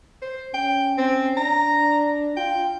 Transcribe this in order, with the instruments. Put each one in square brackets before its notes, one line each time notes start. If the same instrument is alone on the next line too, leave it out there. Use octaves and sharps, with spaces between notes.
[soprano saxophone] C5
[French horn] C#4 [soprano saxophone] G5
[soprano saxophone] C4
[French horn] D4 [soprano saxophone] A#5
[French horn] F4 [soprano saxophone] G5